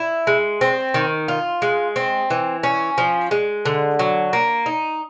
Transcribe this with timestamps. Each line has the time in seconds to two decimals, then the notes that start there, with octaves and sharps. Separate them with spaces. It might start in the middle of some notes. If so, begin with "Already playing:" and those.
Already playing: E4
0.27 G#3
0.61 C4
0.94 D#3
1.28 F4
1.62 G#3
1.96 C4
2.30 E3
2.63 C#4
2.98 F3
3.31 G#3
3.65 D3
3.99 F#3
4.33 A#3
4.66 D#4